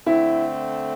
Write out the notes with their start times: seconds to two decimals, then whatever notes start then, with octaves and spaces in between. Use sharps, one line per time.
0.06 D3 A3 C4 E4